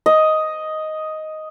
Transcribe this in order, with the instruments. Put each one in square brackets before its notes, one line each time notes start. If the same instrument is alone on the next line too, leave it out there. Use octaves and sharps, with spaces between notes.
[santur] D#5